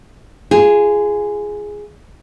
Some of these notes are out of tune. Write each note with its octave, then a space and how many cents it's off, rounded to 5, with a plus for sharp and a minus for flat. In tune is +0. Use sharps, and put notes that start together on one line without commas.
F4 -30 G#4 +0